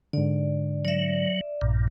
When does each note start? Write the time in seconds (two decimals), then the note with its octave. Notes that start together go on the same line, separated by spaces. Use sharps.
0.13 G#2 D3 D5
0.85 F#3 D5 E5
1.61 A#1 G2 A#2